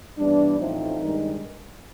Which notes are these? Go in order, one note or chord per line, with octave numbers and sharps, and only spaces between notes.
G2 E3 G3 B3 D4
A1 A2 F3 A3 C4 D#4
G2 D#3 G#3